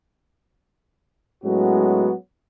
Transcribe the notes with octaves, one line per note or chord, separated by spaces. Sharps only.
A2 F#3 G#3 B3 C#4 F#4